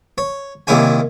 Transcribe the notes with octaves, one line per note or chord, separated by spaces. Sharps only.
C#5
C2 A#2 D#3 E4 C#5 G#5